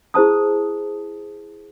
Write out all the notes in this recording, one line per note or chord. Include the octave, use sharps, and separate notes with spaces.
E4 G#4 C5 A5 D#6